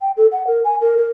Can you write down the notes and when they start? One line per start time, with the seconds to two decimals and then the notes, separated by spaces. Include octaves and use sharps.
0.01 G5
0.17 A4
0.32 F#5
0.47 A#4
0.65 G#5
0.81 A#4
0.98 A#4